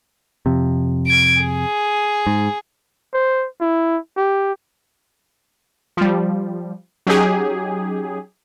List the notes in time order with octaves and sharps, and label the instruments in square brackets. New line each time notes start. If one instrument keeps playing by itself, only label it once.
[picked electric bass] F2 C3
[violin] G#6 D7
G#4
[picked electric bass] G#2
[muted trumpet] C5
E4
G4
[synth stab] F3 G3
F#3 C#4 D#4 G4 G#4